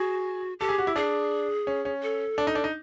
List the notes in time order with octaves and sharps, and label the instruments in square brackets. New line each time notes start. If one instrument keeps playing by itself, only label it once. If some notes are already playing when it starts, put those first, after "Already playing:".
Already playing: [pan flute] F#4 [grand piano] G#4
[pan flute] G4 [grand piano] A4
[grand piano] G#4
F#4
E4
[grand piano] D4 [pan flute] G#4
[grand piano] C#4
C#4
[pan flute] A4
[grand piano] D4
D#4
D4
D#4